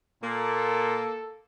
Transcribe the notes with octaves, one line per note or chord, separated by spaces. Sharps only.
A#2 A#3 A4